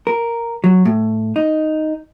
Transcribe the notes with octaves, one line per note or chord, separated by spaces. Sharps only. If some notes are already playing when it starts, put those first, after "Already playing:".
A#4
F#3
A2
D#4